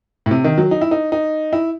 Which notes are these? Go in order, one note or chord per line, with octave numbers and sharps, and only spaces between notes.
A2
C3
D#3
F#3
D#4
E4
D#4
D#4
E4